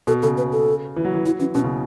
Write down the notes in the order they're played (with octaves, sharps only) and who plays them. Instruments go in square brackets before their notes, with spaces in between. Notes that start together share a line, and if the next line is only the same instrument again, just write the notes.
[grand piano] B2 [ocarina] A4
[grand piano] C#3 [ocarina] A4
[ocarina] B4
A4
[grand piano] E3
F#3
E3
[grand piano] F#3 [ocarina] E4
[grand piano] E3 [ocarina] C#4
[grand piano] B2 [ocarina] C#4
[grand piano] C#3